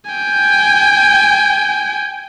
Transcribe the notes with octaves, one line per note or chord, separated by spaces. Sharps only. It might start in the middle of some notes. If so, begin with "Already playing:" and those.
G5 G#5